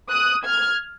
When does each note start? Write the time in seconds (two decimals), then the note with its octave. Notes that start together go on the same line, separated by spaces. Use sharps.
0.10 D#6 F#6
0.44 F6 G#6